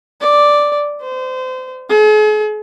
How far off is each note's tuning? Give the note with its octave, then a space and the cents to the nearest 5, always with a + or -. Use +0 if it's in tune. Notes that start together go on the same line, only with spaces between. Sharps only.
D5 +0
C5 -30
G#4 +45